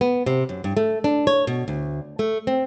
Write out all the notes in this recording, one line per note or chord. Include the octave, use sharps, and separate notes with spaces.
B3
C3
F#2
G2
A3
D4
C#5
B2
D2
A3
C4